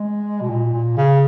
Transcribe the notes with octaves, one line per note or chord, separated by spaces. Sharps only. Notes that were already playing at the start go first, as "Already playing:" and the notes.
Already playing: G#3
B2
A#2
A#2
C#3